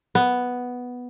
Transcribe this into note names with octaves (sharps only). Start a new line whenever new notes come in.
B3